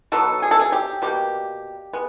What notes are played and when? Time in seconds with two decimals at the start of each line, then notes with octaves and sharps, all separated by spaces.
0.12 B2 F#3 B3 A4
0.42 G#4
0.51 A4
0.59 G#4
0.72 G4
1.02 B2 G3 A#3 G4
1.93 G#3 B3